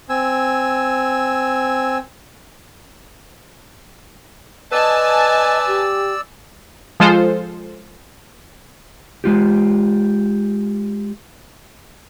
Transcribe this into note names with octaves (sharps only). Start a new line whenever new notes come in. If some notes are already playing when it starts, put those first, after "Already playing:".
C4 G#5 E6
B4 D5 D#5 G#5 A5 E6
G4
F3 G#3 F4 A4 C5
G#3 F4 G4